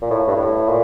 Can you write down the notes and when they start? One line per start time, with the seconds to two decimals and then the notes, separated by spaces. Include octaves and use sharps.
0.02 A#2
0.10 A2
0.27 G2
0.36 A2
0.69 A#2